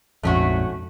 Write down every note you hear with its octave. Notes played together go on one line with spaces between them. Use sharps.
A#1 F2 G#2 A3 C#4 F#4